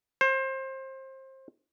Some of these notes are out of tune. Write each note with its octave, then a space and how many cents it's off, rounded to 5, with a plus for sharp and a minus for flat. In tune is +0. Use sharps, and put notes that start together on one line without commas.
C5 +25